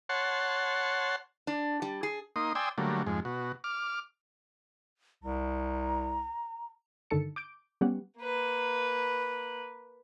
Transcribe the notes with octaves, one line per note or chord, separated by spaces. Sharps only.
C#5 F#5 A5 C6
D4
G3
G#4
A#3 D#4 C6 D#6
D5 G5 G#5 C6 D#6 E6
D3 F#3 G3 A3 A#3
F2 G#2 G#3
B2 F#4
D6 F6
C2 A#5
G2 D3 D#3 A4 A5 C#7
D6 G6 D7
G3 B3 C#4 G4 F#5
A#3 B4